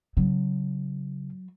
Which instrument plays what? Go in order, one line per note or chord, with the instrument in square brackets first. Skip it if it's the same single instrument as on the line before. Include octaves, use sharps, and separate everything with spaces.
[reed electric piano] C#3 [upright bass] F#3